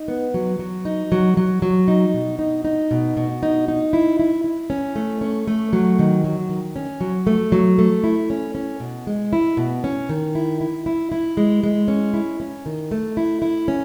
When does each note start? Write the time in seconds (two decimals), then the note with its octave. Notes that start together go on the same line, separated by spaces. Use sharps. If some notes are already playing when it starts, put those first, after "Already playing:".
Already playing: D#4
0.08 B3
0.34 F#3
0.59 F#3
0.85 D#4
1.12 F#3
1.37 F#3
1.62 F#3
1.88 D#4
2.14 B2
2.39 D#4
2.65 D#4
2.91 B2
3.17 B2
3.43 D#4
3.68 D#4
3.93 E4
4.19 E4
4.44 E4
4.70 C#4
4.96 A3
5.21 C#4
5.47 A3
5.73 F#3
5.99 D#3
6.24 F#3
6.49 D#3
6.76 C#4
7.01 F#3
7.27 A3
7.52 F#3
7.78 A3
8.04 E4
8.30 C#4
8.55 C#4
8.80 B2
9.07 G#3
9.33 E4
9.57 B2
9.84 C#4
10.09 D#3
10.35 E4
10.61 E4
10.86 E4
11.12 E4
11.37 G#3
11.63 G#3
11.88 C#4
12.14 E4
12.40 C#4
12.66 D#3
12.91 A3
13.17 E4
13.42 E4
13.68 C#4